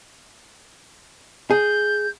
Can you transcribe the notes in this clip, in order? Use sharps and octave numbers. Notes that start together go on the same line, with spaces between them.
G#4 G6